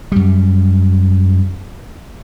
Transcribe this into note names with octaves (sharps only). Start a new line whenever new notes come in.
F#2 G3